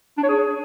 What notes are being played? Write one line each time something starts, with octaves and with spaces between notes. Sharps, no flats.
D4
C#5
G#4